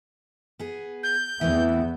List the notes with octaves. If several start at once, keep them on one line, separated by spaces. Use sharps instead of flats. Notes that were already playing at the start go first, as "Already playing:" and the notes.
B3 G#4
G6
E2 E3 A3 B3 C4 E5